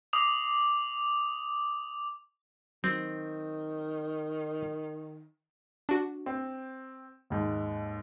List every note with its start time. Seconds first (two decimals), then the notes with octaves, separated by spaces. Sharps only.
0.13 D6 D#6 F7
2.84 D#3 F#3 C4
5.89 D4 F#4
6.26 C4
7.30 D#2 G#2